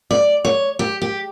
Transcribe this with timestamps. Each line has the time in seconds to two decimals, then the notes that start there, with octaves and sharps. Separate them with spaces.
0.11 D5
0.44 C#5
0.79 G4
1.02 G4